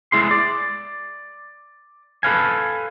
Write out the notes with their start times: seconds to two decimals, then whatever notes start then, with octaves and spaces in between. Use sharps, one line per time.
0.12 G#3 E4 G#4 C6
0.31 D5
2.23 A4 B4 F5 G#5